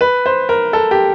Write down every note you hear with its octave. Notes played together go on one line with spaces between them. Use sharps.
B4
C5
A#4
A4
G4